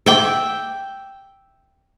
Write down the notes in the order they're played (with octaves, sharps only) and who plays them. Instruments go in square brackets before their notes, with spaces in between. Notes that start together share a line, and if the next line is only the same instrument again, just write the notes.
[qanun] E5 G5 D6